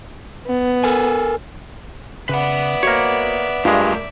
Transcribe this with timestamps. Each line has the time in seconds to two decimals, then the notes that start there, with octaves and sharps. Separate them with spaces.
0.47 B3
0.84 A4 A#4 G#5
2.29 C#3 B4 D5 E5 F#5
2.83 A#3 F#4 A#4 C5 C#5
3.65 G2 G#3 A3 F4 A#4 F5